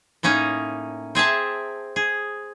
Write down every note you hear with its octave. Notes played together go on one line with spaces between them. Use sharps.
A2 A#3 C#4 D#4 A#5
C4 G#4 E5 A5
G#4